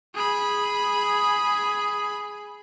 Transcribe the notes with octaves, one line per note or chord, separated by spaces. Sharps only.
G#4 B5